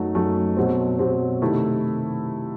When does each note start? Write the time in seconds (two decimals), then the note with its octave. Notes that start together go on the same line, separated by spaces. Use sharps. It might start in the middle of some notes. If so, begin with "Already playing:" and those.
Already playing: F#2 F#3 A3 D#4 F#4
0.15 F#2 F#3 A3 D#4 F#4
0.57 B2 F#3 C4
0.99 B2 F#3 C4
1.42 C3 D#3 A3 E4